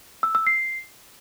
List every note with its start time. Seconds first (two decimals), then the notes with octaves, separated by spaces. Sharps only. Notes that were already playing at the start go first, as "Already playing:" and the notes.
0.23 E6
0.35 E6
0.47 C7